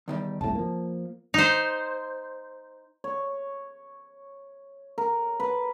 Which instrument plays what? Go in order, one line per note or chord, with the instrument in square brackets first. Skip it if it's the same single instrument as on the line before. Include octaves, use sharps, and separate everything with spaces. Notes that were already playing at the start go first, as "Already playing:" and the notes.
[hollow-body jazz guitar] E2 D#3 G3
[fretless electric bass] F#1 C2 A2 [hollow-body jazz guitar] A5
[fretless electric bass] F3 A#3
[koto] D#4 C5
[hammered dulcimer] C#5
A#4
B4